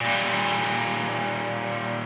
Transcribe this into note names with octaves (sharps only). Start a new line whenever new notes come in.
A#2 G3